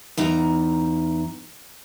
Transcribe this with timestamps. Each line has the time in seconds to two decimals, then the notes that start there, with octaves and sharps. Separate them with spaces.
0.17 E2 D#4 A#5